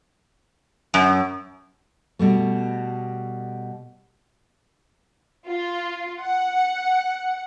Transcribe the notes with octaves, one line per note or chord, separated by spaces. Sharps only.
F#2
B2 G3 A3
F4
F#5